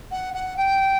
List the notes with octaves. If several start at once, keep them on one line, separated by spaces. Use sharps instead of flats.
F#5
F#5
G5